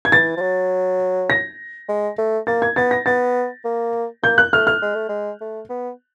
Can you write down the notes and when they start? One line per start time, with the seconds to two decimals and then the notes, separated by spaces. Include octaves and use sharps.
0.05 G#6
0.12 E3 A6
0.37 F3
0.41 F#3
1.30 A#6
1.88 G#3
2.18 A3
2.47 A#3 A6
2.62 G#6
2.76 B3 A6
2.91 A#6
3.06 B3 A6
3.65 A#3
4.23 A#3 G6
4.38 F#6
4.53 A3 F6
4.67 F6
4.82 G#3
4.95 A3
5.09 G#3
5.41 A3
5.69 B3